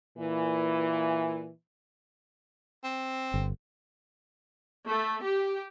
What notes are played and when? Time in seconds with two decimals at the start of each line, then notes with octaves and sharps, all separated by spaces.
0.18 A#2 E3
2.84 C4
3.34 G1
4.86 A3
5.22 G4